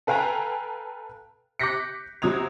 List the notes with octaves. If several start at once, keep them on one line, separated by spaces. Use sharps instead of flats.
A4 B4 F5 G5 G#5 A#5
D6 F#6 G6 A#6 B6 C#7
C3 F#3 D#6 G#6 F7